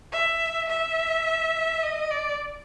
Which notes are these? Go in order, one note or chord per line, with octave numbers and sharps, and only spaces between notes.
E5
E5
D#5
D5